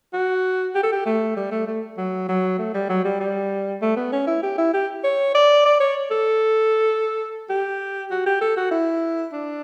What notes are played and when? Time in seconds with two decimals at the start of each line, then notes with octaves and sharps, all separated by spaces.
0.13 F#4
0.75 G4
0.83 A4
0.92 G4
1.06 A3
1.37 G3
1.51 A3
1.67 A3
1.98 F#3
2.29 F#3
2.59 A3
2.74 G3
2.89 F#3
3.05 G3
3.20 G3
3.82 A3
3.96 B3
4.12 C#4
4.27 E4
4.43 G4
4.58 E4
4.74 G4
5.04 C#5
5.35 D5
5.66 D5
5.80 C#5
6.11 A4
7.49 G4
8.11 F#4
8.26 G4
8.41 A4
8.57 F#4
8.71 E4
9.33 D4